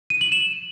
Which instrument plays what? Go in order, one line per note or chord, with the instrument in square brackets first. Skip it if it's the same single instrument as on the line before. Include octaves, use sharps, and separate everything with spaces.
[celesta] D#7
F#7
E7